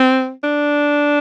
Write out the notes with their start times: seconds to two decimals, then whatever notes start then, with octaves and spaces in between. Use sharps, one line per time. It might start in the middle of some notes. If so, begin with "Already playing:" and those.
Already playing: C4
0.44 D4